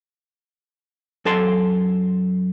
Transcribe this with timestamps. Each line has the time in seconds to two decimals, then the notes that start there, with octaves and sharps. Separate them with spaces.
1.25 F#2 A4 A5 C6